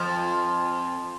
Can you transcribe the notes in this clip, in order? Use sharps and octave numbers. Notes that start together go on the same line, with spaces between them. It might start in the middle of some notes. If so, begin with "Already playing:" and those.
Already playing: F2 F3